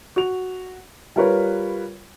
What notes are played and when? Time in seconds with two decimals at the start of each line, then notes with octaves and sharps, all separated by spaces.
0.16 F#4 F7
1.16 G3 F4 A#4 B4 C#5